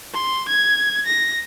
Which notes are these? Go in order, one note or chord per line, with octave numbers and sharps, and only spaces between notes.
C6
G#6
A#6